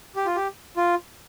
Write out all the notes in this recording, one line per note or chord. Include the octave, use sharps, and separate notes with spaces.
G4
F4
G4
F4